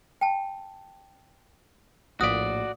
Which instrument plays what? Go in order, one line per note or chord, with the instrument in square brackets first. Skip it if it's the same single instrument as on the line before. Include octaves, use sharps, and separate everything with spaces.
[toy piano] G5 A5
[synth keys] A#1 A2 [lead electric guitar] F#4 D5 [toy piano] F5 D#6